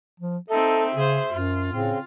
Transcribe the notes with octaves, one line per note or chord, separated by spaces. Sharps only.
F3
C4 D#4 A4 E5
C#3 G#4 C5
F#2 F4
A2 C#3 C4